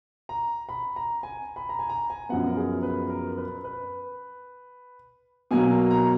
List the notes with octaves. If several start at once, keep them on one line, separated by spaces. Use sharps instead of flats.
A#5
B5
A#5
G#5
B5
A#5
G#5
A#5
G#5
F#2 F3 B3 F#5
A#4
G#4
A#4
B4
A#4
B4
B4
B2 F#3 A#3 G#5
A#5